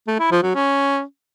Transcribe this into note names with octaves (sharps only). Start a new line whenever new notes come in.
A3
E4
F3
F#3
C#4